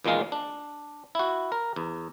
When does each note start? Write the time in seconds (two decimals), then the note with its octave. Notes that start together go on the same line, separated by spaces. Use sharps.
0.04 E2 A#2 D#3 G#3 F5
0.32 D4
1.15 E4 F#4
1.52 A#4
1.76 E2